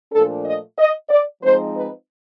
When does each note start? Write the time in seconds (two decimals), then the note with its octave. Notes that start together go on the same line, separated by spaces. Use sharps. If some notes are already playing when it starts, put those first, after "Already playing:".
0.12 A#2 F3 A3 D4 A4
0.44 D#5
0.78 D#5
1.09 D5
1.42 F3 G#3 C4 D#4 C5
1.75 B4